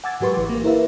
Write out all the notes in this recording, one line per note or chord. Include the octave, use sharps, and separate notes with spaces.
F#5 G#5 D6 E6 G#6 A6
G#2 F#3 G4 B4 C6 C#6
G#1 E3 D6
A#3
E4 A#4 B4 E5 F5